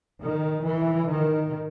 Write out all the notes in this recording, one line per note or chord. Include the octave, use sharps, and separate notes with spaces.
D#3
E3
D#3